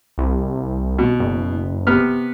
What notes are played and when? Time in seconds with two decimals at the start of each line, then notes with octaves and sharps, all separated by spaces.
0.18 C2
0.99 B2
1.20 F#1
1.87 C3 B3 F6